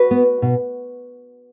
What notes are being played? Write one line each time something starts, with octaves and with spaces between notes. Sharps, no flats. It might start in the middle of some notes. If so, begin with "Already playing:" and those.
Already playing: F#4 B4
B3
B2